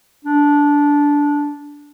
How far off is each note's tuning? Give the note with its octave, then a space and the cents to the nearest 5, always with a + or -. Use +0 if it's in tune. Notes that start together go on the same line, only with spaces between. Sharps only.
D4 -15